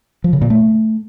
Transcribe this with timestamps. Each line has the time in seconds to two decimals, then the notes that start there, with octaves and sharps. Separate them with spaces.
0.24 F3
0.33 C#3
0.42 A#2
0.50 A3